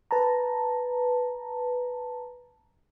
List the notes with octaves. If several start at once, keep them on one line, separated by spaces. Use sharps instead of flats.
B4 A5 A#5